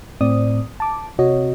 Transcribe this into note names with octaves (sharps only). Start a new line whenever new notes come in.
A2 C4 D5 D#6
A5 D6
C3 F#4 C#5 D#5